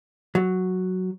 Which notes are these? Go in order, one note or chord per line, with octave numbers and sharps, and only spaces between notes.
F#3